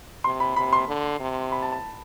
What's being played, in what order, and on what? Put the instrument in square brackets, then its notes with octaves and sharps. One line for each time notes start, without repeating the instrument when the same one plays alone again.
[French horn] C3 [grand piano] C6
[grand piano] B5
[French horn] C3 [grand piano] B5
[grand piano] C6
[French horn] D3
C3
[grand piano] B5
A5
A5